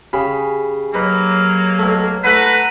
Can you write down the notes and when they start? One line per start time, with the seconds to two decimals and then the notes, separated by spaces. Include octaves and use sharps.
0.13 C#3 G4 G#4 B5
0.94 F#3 A#3 D#4 B4
1.79 B1 A3
2.24 A3 E4 B4 F#5 A#5